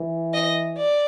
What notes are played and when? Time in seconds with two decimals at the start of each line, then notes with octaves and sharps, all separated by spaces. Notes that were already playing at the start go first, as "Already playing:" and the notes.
Already playing: E3
0.33 D#5
0.78 D5